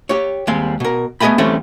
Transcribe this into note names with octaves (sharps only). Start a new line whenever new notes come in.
G4 C#5
D#2 G3 G#3 C4
B2 A#4
A3 B3 G#4 D#5 G5 B5
E3 G3 A3 C4 C#4